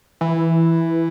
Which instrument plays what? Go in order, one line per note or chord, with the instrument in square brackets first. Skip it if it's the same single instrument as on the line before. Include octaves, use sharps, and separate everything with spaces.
[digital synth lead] E3